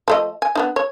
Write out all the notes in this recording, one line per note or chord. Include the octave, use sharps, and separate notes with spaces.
F3 A3 D#5
G#5
B3 D4 D#4
C#5